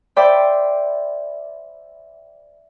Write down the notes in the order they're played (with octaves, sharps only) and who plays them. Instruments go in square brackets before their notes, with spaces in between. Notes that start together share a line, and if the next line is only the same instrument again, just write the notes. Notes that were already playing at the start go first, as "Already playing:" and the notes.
[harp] C5 D5 E5 G5 B5